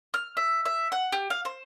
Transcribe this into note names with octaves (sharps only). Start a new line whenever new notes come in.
F6
E5
E5
F#5
G4
F5
C5